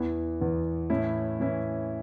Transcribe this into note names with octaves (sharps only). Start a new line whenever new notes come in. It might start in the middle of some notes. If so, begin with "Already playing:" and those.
Already playing: E2 E3 B3
E2 E3 B3
A2 E3 C#4 E4
A2 E3 C#4 E4